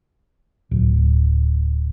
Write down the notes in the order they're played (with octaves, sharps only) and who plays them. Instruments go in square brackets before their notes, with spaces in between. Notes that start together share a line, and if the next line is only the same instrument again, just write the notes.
[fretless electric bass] D1